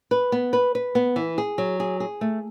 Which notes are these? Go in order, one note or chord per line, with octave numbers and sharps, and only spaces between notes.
B4
B3
B4
B4
B3
E3
G#4
F#3
G#4
G#4
A3